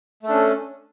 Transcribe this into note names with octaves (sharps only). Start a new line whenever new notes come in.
A3 C#4 D4 A4